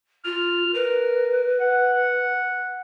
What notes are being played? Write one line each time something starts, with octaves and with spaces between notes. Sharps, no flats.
F4 F6
A#4 B4
F#5